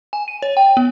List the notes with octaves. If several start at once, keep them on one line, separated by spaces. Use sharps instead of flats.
G#5
D#7
C#5
G5
B3